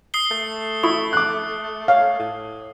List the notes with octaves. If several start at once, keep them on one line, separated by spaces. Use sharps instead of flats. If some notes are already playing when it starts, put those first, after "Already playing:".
D#6 C7 G7
A3
E4 C#6 D#6
D6 F#6
C#5 F5
A2